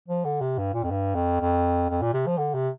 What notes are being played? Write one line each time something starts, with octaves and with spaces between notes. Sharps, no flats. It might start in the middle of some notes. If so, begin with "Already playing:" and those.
F3
D3
C3
G2
A#2
F2
G2
F2
F2
F2
A#2
C3
F3
D3
C3